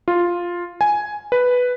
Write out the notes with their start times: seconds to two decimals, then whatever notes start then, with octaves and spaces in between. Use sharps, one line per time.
0.08 F4
0.81 G#5
1.32 B4